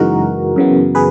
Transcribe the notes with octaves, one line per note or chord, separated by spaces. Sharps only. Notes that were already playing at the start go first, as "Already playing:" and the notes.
Already playing: F#2 C#3 E3 G#3 D#4 F#4 A#4
F#2 C#3 E3 B3
G#4 B4